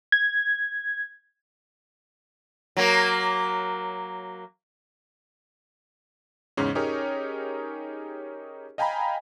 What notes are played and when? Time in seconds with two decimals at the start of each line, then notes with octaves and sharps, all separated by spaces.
0.12 G#6
2.77 F#3 A#3
6.57 E2 G#2 C#3 C#4
6.75 C#4 D#4 G4 G#4 A#4 C#5
8.78 D#5 F5 G5 G#5 A#5 B5